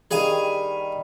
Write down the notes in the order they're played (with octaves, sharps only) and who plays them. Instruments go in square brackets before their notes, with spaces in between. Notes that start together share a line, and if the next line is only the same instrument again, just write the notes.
[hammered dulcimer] D#3 G3 [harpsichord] G#4 F5 G#5